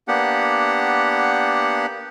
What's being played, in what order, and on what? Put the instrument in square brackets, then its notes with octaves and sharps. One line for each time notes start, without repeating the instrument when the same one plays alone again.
[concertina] A#3 B3 D4 G4 F#5